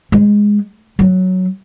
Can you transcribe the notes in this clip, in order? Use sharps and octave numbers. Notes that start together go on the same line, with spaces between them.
G#3
F#3